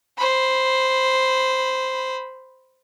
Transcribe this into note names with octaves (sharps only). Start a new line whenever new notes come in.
C5 B5